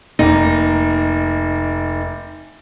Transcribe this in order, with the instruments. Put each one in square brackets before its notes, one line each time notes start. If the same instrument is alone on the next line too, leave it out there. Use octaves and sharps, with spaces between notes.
[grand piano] F1 A#3 [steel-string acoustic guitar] D#4